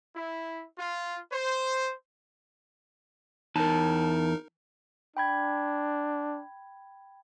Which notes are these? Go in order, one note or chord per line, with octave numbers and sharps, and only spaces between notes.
E4
F4
C5
E2 D#4 A#4 A5
D4 G5 B5 G#6